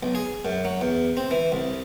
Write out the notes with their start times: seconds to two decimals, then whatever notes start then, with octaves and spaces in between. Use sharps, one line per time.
0.03 B1
0.15 G#4
0.45 F#2
0.65 F#3
0.81 E2
1.17 C4
1.31 E3
1.52 C2